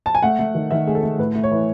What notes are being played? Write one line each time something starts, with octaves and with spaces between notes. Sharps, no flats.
A5
G#5
A3 F#5
A3
D#3
D#3 E5
A3 G#4
A4
A3
A2 B4
A3
C#5
E3